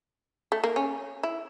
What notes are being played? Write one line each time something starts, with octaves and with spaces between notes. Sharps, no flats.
A3
A#3
C#4
E4